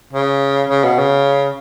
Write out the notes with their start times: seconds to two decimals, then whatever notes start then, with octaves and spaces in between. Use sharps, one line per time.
0.13 C#3
0.69 C#3
0.84 B2
0.99 C#3